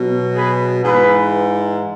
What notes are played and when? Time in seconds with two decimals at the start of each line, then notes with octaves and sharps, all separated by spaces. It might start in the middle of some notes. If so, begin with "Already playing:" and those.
Already playing: B2 F#3
0.35 G#4 B4
0.84 G#2 E3 G#4 B4